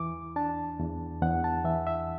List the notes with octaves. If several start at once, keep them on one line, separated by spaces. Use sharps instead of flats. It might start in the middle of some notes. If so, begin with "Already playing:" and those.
Already playing: E2 E3 D6
D4 A5
E2
E2 F#5
A5
E3 E5
E5